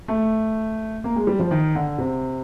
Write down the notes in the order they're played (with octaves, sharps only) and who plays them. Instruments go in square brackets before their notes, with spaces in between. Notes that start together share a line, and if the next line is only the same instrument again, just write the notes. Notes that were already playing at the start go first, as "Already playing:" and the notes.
[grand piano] A3
A#3
G#3
G3
F3
D#3
D3
C3